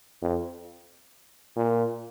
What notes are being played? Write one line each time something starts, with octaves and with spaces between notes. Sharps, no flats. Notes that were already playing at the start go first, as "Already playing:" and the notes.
F2
A#2